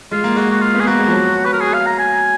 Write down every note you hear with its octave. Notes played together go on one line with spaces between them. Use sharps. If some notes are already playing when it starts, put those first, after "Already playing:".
G#3 F4
A#3
G#3 F#4
F#4
F4
B3
G#4
A#3 F#4
G#3
F3
F#3
B4
A#4
G#4
F5
A#5
G#5